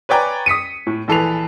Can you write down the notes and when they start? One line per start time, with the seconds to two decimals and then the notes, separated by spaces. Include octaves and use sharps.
0.09 B4 C#5 D5 G5 G#5 A#5
0.46 D#6 B6 C#7 D#7
0.87 A2
1.08 A#1 E3 A4 B4 C7 F7